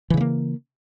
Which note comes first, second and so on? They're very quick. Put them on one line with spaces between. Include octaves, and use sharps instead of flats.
E3 C#3 G#3 A#3